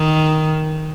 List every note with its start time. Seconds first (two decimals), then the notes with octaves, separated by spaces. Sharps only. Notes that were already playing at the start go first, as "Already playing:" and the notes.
Already playing: D#3